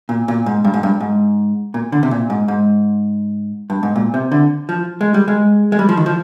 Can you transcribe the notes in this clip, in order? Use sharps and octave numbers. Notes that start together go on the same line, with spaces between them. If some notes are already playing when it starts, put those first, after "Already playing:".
A#2
A#2
G#2
G2
G#2
G2
G#2
A#2
D3
C3
A#2
G#2
G#2
G2
G#2
A#2
C3
D3
F3
G#3
G3
G#3
G#3
G3
F3
D#3
F3